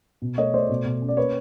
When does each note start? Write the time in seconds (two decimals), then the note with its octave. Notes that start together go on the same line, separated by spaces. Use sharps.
0.22 B2
0.38 A3 C#5 D#5
0.54 A3 C5 D5
0.69 B2
0.85 B2
1.02 C#4
1.09 D5
1.17 A#3 B4 C#5